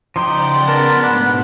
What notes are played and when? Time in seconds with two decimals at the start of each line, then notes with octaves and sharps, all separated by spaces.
0.16 C#3 F3 D#4 G4 D5 F#5 C6
0.68 B3 A#4 A5
1.01 G#2 B2 A3 D4